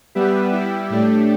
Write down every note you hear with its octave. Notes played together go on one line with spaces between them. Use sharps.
G3 B3 G4 B4 E5
G3 E4 G4 E5
A2 A3 D4 G4